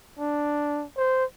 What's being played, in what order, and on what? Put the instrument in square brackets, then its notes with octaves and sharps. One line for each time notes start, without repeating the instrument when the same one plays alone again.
[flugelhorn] D4
C5